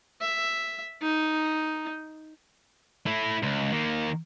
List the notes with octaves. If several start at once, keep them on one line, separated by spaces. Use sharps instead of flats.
E5
D#4
A3 E4
C#2
D#3 A#3